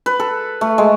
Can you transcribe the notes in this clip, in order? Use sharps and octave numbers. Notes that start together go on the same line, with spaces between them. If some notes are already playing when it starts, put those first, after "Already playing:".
B4
A4
A3
G#3